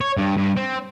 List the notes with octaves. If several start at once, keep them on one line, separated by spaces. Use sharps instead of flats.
C#5
G2
G2
C4